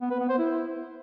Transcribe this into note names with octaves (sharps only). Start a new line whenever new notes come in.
B3
B4
B3
C5
E4